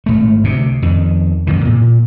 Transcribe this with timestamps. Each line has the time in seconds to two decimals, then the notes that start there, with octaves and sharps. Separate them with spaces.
0.06 G#1 C#2 A3
0.44 D2 C3
0.82 F2 D#3
1.47 F#2 D#3 E3
1.65 A#2